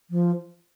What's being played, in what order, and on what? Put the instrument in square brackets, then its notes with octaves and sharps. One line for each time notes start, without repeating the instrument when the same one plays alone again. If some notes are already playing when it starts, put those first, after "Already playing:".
[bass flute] F3